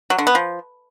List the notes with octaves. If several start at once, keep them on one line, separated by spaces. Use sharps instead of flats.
F#3
D3
B3
F3